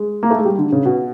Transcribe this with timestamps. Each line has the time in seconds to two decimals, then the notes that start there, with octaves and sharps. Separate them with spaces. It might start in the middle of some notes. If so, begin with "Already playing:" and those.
Already playing: G#3
0.23 A#3
0.31 A3
0.38 G#3
0.45 G3
0.58 D3
0.72 C#3
0.85 B2